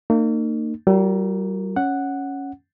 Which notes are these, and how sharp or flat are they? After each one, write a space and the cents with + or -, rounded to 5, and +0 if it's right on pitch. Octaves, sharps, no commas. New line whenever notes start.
A#3 -35 D#4 -40
G3 -40 F4 +15 A#4 -15
C#4 +0 F#5 +0